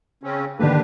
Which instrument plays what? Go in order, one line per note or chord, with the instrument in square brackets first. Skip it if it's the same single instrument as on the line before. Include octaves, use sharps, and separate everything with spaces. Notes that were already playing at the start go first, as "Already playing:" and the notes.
[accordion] C#3 C4 C#4
[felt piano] D3 D#3 A#3 [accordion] D4 G4 B4